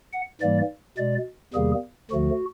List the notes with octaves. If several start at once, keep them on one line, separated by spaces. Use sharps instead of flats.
F#5
G#2 E3 G3 A#3 D5
B2 G#3 D5
E2 C3 D#3 G3 A#3 G#4
D2 D3 F3 A3 F#4